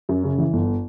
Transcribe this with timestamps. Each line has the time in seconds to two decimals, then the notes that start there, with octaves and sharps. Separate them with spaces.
0.09 F#2
0.24 C#3
0.38 E3
0.53 G1